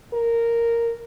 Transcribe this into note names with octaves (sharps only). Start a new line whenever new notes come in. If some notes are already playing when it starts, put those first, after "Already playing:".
A#4